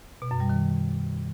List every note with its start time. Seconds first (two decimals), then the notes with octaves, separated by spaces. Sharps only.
0.22 B2
0.31 F#2
0.40 G3
0.49 D#3